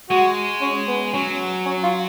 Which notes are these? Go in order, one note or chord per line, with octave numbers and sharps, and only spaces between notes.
G#3 F#4
C#4
B3
F#3 C#4
C#4
F4